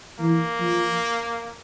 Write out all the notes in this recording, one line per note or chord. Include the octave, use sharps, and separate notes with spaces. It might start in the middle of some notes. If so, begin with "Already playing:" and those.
E3 A#3
F3